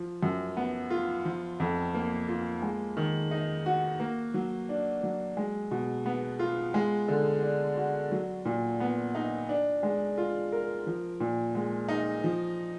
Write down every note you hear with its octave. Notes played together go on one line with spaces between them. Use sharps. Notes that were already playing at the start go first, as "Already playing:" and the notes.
Already playing: F3
F#2
B3
F4
F3
F2
A#3
F4
G#3
D#3
D#4
F#4
A#3
F#3
D4
F#3
G#3
B2
B3
F4
G#3
D3
D4
F#4
F#3
A#2
B3
D#4
D4
G#3
F4
A#4
F3
A#2
G#3
D#4
F3